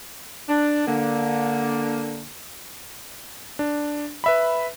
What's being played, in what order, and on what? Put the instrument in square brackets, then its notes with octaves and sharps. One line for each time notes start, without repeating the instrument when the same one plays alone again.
[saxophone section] D4
D3 A#3
[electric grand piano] D4
B4 E5 B5